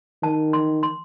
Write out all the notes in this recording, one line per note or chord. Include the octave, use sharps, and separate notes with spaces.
D#3 A5
C6
C6